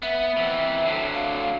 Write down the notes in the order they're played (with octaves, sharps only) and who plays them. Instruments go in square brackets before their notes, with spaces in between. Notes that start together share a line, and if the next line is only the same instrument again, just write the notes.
[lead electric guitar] B3 [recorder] E5
[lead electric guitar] E3 C4
D3 F#3
[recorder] F5